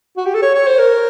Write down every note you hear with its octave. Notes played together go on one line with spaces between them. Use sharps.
F#4
G4
A4
C#5
C#5
C5
A#4